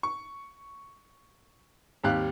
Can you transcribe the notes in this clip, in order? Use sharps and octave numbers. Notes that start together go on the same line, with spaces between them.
C#6
G#1 D#2 G3 G4 F5 F#6